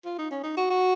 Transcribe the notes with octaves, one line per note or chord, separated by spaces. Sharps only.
F4
D#4
C#4
D#4
F#4
F#4